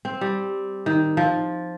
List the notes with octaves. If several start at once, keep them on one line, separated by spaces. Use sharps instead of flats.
C4
G3
D#3
F3